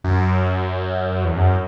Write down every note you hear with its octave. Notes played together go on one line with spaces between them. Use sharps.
F#2
E2
F#2